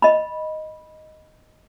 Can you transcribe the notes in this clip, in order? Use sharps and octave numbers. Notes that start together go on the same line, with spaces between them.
D#5 B5